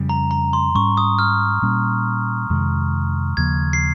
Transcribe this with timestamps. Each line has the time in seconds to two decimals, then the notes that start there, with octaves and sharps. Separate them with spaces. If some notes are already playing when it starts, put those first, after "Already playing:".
Already playing: F2 C#3 G3
0.09 A#5
0.31 A#5
0.53 C6
0.75 G#2 G3 C#4 C#6
0.97 D#6
1.19 F6
1.62 A#2 G3 A#3 C#4
2.50 F2 C3 D#3 G#3
3.37 D#2 C#3 F3 A#3 G#6
3.73 C7